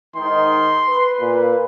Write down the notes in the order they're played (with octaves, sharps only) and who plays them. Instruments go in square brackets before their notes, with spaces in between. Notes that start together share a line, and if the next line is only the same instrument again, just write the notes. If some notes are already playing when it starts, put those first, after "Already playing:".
[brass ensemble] G#2 D#3 D#4 [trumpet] C6
[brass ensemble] B4
[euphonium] A#2